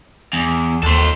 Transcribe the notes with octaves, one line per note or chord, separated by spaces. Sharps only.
E2
D#2 A4 C5